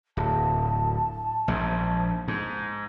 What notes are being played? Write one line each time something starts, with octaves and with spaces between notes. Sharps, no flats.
D1 A5
A#1 G#2
G#2